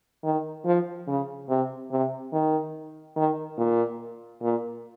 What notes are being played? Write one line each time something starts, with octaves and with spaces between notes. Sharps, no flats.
D#3
F3
C#3
C3
C3
D#3
D#3
A#2
A#2